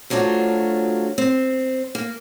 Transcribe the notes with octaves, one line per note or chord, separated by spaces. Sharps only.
F3 F#3 A3 D4 F4 F#4
C4
A#3